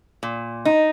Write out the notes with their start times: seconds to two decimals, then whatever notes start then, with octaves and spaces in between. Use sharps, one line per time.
0.23 A#2
0.65 D#4